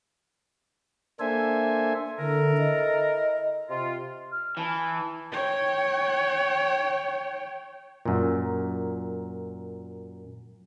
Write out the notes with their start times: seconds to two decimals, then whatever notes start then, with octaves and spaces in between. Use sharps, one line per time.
1.20 A#3 D4 A4 C5 E5 G#5
2.19 D3 E4 A4 A#4
2.58 D#5
3.70 C3 F4
4.31 F6
4.57 E3 A5
5.32 C#5 G5
8.05 F#2 A#2